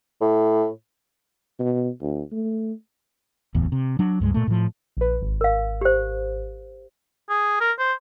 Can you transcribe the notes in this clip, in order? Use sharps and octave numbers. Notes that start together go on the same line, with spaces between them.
A2
B2
D2
A3
D1 A1 E2
C3
F#3 D4
C#2 G2 G#3
A#2 A3
A2 F3
A#1 B4
G#1
A#4 F5
G4 C5
G#4
A#4
C5